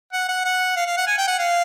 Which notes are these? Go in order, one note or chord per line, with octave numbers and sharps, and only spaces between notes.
F#5
F#5
F#5
F5
F5
F#5
G#5
G5
F#5
F5